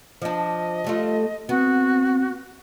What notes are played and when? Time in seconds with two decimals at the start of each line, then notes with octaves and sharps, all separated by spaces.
0.22 F3 D4 D#5
0.84 G3 A3 F4
1.49 B3 C4 F#4